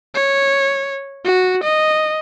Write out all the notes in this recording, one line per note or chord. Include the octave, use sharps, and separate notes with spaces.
C#5
F#4
D#5